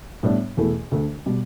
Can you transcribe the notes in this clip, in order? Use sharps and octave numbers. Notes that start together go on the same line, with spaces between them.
A2 G3 B3 D4
E2 B2 A3 E4 A4
D2 D3 A3
B2 G3